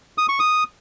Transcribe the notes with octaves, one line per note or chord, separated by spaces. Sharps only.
D#6
C#6
D#6